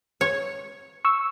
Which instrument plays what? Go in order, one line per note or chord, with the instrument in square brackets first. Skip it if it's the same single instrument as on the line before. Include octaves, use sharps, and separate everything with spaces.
[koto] C#5
[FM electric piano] C#6 E6